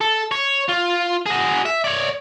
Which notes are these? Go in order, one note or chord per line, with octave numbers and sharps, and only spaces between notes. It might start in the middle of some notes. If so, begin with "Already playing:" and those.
A4
C#5
F4
F#4 G#4
E5
C#5 D5